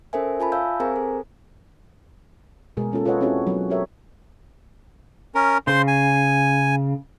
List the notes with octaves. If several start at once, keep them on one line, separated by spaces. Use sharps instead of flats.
C#4 A4 A#4 C5 E5 G#5
F4 G#5 A5 B5
C#5 E5 F5 E6 G6
C4 G#4 A#4 C5 G#5 A#5
A4
B2 G#3 G#4 A#4
A#3 C#4 F4 A4
F4 A4 B4 C#5 D#5 F#5
C4 C#4 E4 F#4 G#4 C#5
F#3 B3
F#4 G4 A4 A#4 C#5 E5
C#4 A#4
C#3 C5 C6
G#5